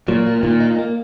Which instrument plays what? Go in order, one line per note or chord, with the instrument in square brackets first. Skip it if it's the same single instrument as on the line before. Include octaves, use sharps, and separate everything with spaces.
[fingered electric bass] A#2 [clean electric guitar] F#3
[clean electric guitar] A#3
[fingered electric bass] A#2 [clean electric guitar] D#3
[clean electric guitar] D#4
A#3